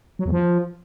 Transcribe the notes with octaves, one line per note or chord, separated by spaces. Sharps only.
F#3
E2
F3